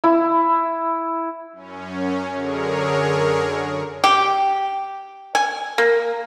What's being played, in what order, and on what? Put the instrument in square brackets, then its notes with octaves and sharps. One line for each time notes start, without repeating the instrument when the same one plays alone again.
[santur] E4
[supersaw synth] F#2 C#4
F#2 D3 G#4 A#4 C#5
[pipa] G4
G#5
A#3